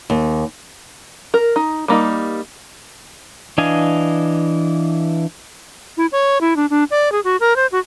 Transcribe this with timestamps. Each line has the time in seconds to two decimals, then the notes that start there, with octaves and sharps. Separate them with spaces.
0.10 D#2
1.34 A#4
1.56 D#4
1.88 G3 A#3 D#4
3.58 E3 D4 D#5 F5 G#5
5.97 E4
6.12 C#5
6.41 E4
6.56 D4
6.70 D4
6.91 D5
7.12 G#4
7.24 F#4
7.40 A#4
7.56 C5
7.72 F#4